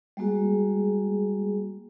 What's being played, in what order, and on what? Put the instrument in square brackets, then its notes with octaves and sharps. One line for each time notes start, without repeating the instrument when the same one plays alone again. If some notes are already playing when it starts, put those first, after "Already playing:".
[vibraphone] G3 G#3 A#3 F#4 G#4